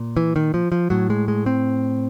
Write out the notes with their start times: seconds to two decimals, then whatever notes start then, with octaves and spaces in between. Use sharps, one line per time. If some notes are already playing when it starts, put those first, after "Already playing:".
Already playing: A#2
0.17 E3
0.36 D#3
0.54 F3
0.72 F3
0.90 A2 F#3
1.10 G#3
1.28 G#3
1.46 C4